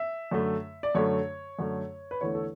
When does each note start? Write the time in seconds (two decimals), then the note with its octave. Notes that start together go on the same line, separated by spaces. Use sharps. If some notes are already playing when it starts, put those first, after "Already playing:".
Already playing: E5
0.31 F#2 D3 A3
0.83 D5
0.95 F#2 D3 A3 C#5
1.59 F#2 D3 A3
2.11 B4
2.21 E2 D3 A3 C#5
2.35 A4